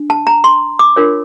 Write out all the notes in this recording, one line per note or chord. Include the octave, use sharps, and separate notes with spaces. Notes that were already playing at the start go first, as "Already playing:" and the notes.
Already playing: D4
A5
A#5
C6
D6
D4 F4 A#4 C#5